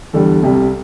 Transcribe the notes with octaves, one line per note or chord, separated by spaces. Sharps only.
E2 D3 G3 A4
C2 C3 G3